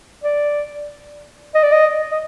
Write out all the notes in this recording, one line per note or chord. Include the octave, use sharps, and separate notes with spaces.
D5
D#5
D5
D#5
D#5